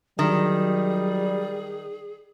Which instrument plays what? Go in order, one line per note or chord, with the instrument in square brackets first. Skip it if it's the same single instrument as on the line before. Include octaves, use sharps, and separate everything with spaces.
[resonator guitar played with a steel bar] D#3 [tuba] F#3 [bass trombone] G3 [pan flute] G#4